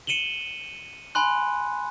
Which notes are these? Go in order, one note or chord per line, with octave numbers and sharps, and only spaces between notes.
C#7 D#7 E7 F#7 G7
G#5 B5 C6 F#6